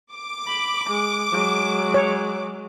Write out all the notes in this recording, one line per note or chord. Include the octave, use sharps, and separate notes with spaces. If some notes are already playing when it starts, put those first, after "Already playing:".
D6
B5
G#3
F#3 G#3
C#5